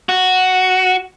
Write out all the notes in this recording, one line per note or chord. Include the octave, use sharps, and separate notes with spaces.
F#4